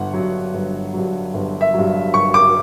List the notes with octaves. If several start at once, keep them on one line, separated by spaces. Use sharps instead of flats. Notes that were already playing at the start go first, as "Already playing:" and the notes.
Already playing: G1 F#5
G2 F#3
G1
G2 F#3
G1
E5
G2 F#3
G1 C#6
D6